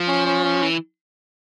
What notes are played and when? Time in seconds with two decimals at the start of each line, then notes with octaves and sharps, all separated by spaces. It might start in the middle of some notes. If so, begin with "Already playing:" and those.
Already playing: F3
0.08 C#4
0.26 C#4
0.44 C#4
0.62 E3